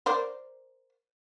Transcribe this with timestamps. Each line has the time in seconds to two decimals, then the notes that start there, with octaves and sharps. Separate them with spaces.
0.06 A#4 C5 D5